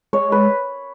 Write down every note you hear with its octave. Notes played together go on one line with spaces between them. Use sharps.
G#3 C#5
B4